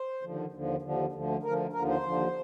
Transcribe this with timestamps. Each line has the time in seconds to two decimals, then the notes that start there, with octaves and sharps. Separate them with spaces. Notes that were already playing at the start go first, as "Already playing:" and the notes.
Already playing: C5
0.22 D#2 D3 F3
0.52 D#2 D3 F3
0.82 D#2 D3 F3
1.12 D2 D3 F3
1.43 D2 D3 F3 A#4
1.73 D#2 D3 F3 A#4
1.88 C5
2.03 D#2 D3 F3